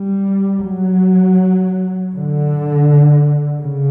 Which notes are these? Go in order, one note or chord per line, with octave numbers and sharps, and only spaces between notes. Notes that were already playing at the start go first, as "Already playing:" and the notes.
Already playing: G3
F#3
D3
C#3